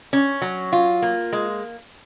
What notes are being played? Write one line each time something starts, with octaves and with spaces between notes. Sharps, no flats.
C#4
F#3
F4
A#3
G#3